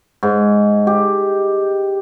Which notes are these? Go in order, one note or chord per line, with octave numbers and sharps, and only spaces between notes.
G#2
G4